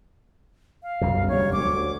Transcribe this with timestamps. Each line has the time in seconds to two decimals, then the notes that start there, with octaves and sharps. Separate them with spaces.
0.83 F5
1.01 C2 F#2 B2
1.28 D2 G3 C#5
1.53 D2 D6